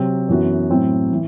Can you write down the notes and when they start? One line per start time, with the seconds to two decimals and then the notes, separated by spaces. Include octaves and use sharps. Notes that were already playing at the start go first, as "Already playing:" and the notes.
Already playing: C3 F#3 C4
0.28 F#2 E3 B3 F#4
0.70 A2 F#3 C4 E4
1.13 E3